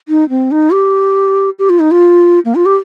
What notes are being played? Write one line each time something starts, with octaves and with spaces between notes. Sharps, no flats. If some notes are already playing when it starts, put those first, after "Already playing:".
D#4
C4
D#4
G4
G4
F4
D#4
F4
A#3
F4
G4